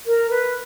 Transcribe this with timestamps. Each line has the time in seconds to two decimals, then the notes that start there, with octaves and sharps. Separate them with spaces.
0.07 A#4
0.30 B4